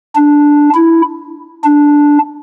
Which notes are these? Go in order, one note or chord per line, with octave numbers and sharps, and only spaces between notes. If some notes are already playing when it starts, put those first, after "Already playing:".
D4
E4
D4